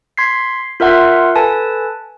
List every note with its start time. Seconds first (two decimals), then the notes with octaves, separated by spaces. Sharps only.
0.17 C6 G#6 B6 C7
0.80 F4 A#4 E5 F#5 C6
1.36 A4 B4 G#5 A5